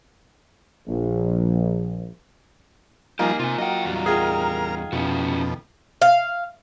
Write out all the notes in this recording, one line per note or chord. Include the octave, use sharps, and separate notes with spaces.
A#1
F3 G3 A#3 D#4 F4 G4 F#5 G#5
C3 F4 G#5
F#3 F4 D#5 F#5 G5 D#6
E2 G3
F4 G#4 A#4 F#5 G5 A#5 F6
F2 B2 C#4 E4 F#4
F5